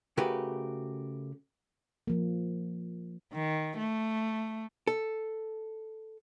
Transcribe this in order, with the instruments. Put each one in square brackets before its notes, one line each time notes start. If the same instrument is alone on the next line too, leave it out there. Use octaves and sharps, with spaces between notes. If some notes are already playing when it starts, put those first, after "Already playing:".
[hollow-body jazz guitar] C#3 A3 F#4 G4 A#4 B4
[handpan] F3 A#3
[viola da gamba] D#3
A3
[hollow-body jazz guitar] A4